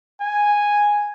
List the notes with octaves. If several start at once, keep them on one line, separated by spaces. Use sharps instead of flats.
G#5